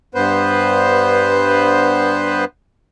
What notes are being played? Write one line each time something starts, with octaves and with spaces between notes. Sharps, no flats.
G2 B3 B4 C5